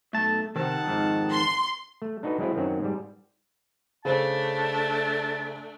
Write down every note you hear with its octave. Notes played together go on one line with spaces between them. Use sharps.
B1 A3 A5
C3 D#3 C4 F#5 A5
F2 G#2
C6
A3
D4 D#4 F#4 A4 B4
F#3 G#3 C4 E4 F4
F#2 D#3 F#3 C4 C#4
G#2 G3
C#3 A3 D4 C5 A5